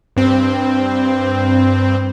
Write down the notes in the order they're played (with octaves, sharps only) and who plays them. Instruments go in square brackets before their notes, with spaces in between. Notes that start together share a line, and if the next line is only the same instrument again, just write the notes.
[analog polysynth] G2 C4